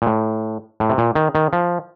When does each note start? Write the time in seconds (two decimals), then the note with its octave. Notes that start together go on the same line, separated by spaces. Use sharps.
0.02 A#2
0.07 A2
0.80 A2
0.90 C3
0.98 A#2
1.15 D#3
1.35 D#3
1.53 F3